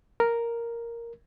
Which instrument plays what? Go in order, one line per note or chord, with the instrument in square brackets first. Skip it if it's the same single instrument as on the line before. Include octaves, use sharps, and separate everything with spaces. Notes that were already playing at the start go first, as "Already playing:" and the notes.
[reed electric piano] A#4